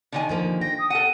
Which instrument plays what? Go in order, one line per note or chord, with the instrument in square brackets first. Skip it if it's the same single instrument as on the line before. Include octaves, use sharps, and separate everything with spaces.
[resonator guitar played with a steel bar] D3 D#3 G#5
[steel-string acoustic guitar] D#2 F3 A#3
[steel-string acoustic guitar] G5 [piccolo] A#6
[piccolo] D#6
[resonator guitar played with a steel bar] A4 F#5 [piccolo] D#7